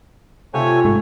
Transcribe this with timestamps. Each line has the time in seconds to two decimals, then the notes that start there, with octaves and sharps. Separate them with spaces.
0.54 C3 A3 F4 C#5 G#5
0.84 G#2 A3 C#5